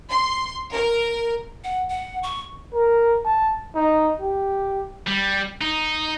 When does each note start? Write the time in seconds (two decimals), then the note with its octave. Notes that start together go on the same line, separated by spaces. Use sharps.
0.11 C6
0.72 A#4
1.64 F#5
1.89 F#5
2.23 C#6
2.73 A#4
3.25 A5
3.75 D#4
4.21 G4
5.07 G3
5.61 D#4